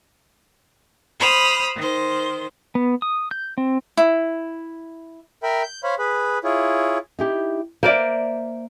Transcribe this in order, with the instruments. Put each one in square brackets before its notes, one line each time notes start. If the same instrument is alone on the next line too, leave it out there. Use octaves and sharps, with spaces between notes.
[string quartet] C5 B5 D#6 F6
D#3 C5
[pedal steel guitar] B3
D#6
G6
C4
[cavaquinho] E4
[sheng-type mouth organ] A#4 E5 G5 B5
G6
C5 C#5 F5 B5
G#4 B4 B5
E4 F4 G#4 C#5
[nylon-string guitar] D#4 E4 G4
[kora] A#3 A#4 D5 [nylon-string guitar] C5 E5